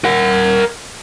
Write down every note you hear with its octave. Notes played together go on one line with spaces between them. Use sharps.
A#4 F#5